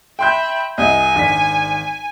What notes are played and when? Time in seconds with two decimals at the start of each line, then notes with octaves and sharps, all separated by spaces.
0.19 E5 G5 B5 C6 G6
0.78 C2 D#5 E5 G#5
1.15 G#1 D4 B6